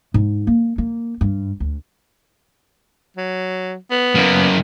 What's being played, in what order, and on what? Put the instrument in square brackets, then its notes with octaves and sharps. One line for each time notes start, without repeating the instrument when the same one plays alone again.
[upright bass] G#2
A#3
A#3
G2
D2
[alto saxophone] F#3
B3
[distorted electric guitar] F#2 A#3